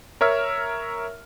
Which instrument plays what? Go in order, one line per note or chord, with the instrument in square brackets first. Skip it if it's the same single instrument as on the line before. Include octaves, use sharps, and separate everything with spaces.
[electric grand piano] A#4 C#5 E5 E6 F6